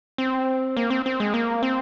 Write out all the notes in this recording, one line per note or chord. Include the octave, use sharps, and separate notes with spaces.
C4
A#3
C4
C4
G#3
A#3
C4